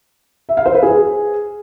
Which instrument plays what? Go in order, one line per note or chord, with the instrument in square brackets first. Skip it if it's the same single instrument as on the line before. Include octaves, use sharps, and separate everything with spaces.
[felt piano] E5
F5
C5
B4
G#4